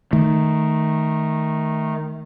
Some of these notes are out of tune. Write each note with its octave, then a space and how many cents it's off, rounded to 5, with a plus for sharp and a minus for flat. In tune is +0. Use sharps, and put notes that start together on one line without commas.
D#3 +0 A3 -10